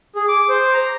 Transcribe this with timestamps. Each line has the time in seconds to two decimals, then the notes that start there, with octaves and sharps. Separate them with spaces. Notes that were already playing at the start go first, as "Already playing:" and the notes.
0.16 G#4
0.28 D6
0.49 C5
0.74 A#5